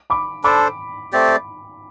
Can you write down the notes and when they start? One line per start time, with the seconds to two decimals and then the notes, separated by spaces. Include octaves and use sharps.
0.10 B5 D6
0.44 D4 A4 C5 B5 D6
1.12 A3 C4 G4 D5